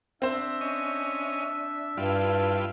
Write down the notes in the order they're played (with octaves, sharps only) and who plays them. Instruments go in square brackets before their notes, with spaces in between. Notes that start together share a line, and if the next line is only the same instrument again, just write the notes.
[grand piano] C4 C5 [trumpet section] D4 E5
[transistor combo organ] C#4 D#5
[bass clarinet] G2 [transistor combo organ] G3 E4 F4